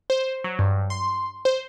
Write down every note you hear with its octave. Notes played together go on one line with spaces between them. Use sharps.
C5
F#3
G2
C6
C5